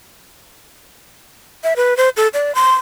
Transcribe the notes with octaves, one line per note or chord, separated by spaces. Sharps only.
E5
B4
C5
A4
D5
C6